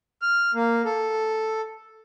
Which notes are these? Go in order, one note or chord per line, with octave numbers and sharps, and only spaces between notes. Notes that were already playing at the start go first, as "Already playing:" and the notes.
F6
A#3
A4